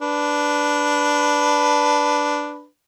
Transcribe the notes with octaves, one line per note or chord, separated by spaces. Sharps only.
D4 B4